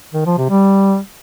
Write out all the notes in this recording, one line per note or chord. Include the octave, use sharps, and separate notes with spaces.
D#3
F3
C3
G3